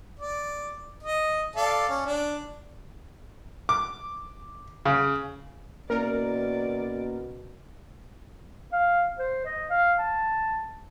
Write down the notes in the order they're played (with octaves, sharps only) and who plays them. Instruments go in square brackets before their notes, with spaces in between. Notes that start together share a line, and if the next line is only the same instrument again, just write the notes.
[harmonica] D5
D#5
A4 D5 F5
C#4
D4
[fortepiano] D6
C#3
[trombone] B2 [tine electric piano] A#3 C#4 E4 [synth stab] A#4 [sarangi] D5
[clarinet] F5
C5
D#5
F5
A5